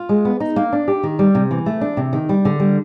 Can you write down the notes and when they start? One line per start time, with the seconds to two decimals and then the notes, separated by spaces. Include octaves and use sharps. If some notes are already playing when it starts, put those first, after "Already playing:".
Already playing: F4
0.09 G#3
0.25 B3
0.40 D#4
0.56 A#3
0.73 D4
0.88 G4
1.03 D#3
1.19 G3
1.35 C3
1.51 E3
1.66 A3
1.81 D4
1.97 C3
2.13 D#3
2.29 G3
2.45 D3
2.60 G3